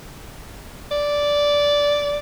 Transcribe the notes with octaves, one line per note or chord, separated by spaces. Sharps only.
D5